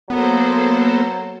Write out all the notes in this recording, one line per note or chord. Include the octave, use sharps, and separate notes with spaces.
F#3 A#3 B3 A4 C5